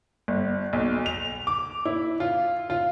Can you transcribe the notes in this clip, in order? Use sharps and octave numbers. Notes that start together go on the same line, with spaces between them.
G1
B1
F7
D6
E4
F4
F4